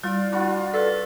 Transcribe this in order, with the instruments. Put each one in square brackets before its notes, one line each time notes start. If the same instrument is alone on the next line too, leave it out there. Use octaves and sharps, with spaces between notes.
[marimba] G3 [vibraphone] E4 D5 [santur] F4
[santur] D4 F4 F#4 [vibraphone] B5
[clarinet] A4 [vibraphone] B4 [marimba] D5